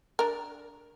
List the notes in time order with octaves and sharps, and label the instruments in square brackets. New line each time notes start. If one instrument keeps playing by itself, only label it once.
[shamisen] D4 A#4